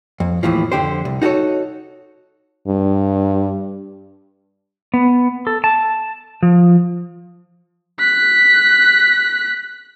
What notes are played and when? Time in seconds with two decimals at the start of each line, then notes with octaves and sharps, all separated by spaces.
0.20 F2
0.43 D#2 A2 E3 F3
0.72 F2 D3 G4 C5
1.05 C2
1.22 D#4 F#4 G#4 A4 C#5
2.68 G2
4.94 B3
5.47 A4
5.64 A5
6.43 F3
8.00 F#6 B6